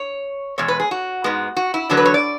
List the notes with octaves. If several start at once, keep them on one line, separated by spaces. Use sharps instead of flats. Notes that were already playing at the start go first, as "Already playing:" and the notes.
Already playing: C#5
E2 B2 G#3 C#5
B4
G#4
F#4
G#2 G#3 B3
F#4
E4
E2 D3 F#3 B3 D4
B4
C#5
D5